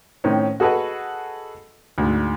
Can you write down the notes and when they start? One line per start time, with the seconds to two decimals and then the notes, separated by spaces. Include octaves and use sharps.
0.24 A2 D#3 C4 C#4
0.60 F#4 G#4 A4 B4 D#5 F#5
1.98 D2 G#2